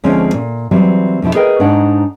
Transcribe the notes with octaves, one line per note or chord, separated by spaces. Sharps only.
D2 F3 G#3 C4 C#4
A#2
E3 F#3 G3 C4
F2 B2 F3 E4
G#4 A#4 B4 D#5 G5
G#2 D4 D#4 C#5 F#5